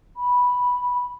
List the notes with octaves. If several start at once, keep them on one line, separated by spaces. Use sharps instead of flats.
B5